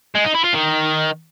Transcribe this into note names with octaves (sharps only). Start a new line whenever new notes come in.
G#3
D#4
E4
F4
D#3